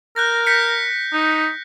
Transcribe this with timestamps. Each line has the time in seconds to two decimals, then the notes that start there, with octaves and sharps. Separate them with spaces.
0.16 A#4 F#6 G6 A#6
0.47 G6 B6 C#7
1.13 D#4